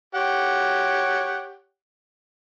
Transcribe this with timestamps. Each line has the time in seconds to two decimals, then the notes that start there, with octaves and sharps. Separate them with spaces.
0.15 G4 C#5 F#5